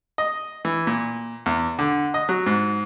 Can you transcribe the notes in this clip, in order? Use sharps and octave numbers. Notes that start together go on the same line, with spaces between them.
D#5
E3
A#2
E2
D3
D#5
F#3
G#2